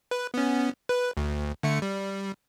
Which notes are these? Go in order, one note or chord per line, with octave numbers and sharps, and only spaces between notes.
B4
B3 C#4
B4
D2
D3 A3 C#7
G3